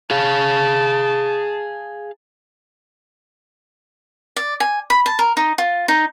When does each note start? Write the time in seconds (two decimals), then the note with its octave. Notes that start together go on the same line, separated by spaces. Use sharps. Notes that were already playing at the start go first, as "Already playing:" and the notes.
0.11 G#4 F5 A5
4.36 D5
4.60 G#5
4.90 B5
5.06 A5
5.19 A#4
5.37 D#4
5.58 F4
5.88 D#4